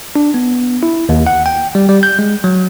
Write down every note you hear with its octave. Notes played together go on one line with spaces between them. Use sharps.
D4
B3
E4
D#2
F#5
G5
G3
G3
G6
G#3
F#3